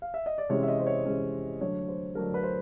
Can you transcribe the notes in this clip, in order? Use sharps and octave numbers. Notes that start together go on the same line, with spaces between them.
F5
E5
D#5
D5
C3 E3 G#3 C#4 C#5
E5
D#5
C5
C#5
C3 E3 G#3 C#4
D3 F#3 A3 D4 C#5
C5
D3 F#3 A3 D4 A#4
B4
C5